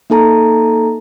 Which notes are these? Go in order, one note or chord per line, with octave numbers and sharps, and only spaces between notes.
A#3 D#4 A4 A5 A#5